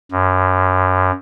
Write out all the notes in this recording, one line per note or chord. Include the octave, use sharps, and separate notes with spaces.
F#2